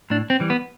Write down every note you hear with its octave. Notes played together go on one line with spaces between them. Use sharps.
A2 D4
C4
E3 G3
B3